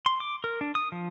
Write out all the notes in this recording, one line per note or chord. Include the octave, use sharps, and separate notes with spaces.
C6
D6
A#4
D4
D#6
F3